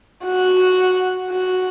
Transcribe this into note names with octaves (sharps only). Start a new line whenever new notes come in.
F#4
F#4